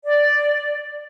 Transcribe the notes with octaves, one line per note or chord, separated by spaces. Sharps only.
D5